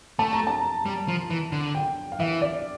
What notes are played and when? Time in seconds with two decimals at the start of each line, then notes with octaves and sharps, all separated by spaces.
0.19 A3 A5
0.33 A#5
0.47 A5
0.86 G3
1.08 F3
1.30 E3
1.52 D3
1.75 G5
2.12 F5
2.20 E3 E5
2.42 D5